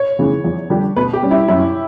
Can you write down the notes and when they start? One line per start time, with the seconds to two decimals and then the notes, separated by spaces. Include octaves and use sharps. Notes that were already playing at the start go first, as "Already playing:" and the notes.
Already playing: C#5
0.19 C#3 E3
0.44 E2
0.70 D3 G3 D4 G4
0.96 B2 B4
1.13 G4
1.23 G3 C#4
1.31 E4
1.48 F#2 E4